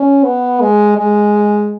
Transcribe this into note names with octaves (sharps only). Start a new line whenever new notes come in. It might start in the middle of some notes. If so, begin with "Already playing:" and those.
Already playing: C#4
B3
G#3
G#3